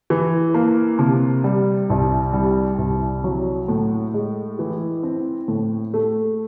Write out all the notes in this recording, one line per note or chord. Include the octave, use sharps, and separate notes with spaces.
E3
A#3
C3
G3
C2
G3
C2
F#3
A2
G#3
E3
C4
A2
A3